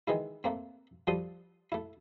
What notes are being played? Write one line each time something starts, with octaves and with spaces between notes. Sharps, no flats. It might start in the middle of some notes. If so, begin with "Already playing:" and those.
D#3 E3 G#3 E4
A3 A#3 C4
F3 G3 A4 C6 D#6
A3 E4